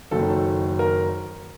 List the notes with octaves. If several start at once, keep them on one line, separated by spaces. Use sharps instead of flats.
F#1 F#2 D#3 F#3 A4
A#4